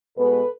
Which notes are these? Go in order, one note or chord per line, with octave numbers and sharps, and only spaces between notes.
B2 G#3 B3 A4 B4